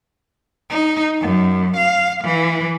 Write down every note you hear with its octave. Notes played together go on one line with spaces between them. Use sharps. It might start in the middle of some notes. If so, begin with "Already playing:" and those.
D#4
F#2
F5
E3